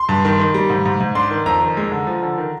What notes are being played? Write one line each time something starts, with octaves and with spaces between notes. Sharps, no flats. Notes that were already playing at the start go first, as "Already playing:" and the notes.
Already playing: C6
G2
D#3
D#3
G3
G#2
G#2
G#2
D4 C6
D#3
F2 A#5
D#3
G#3
D3
F3
D3
D#3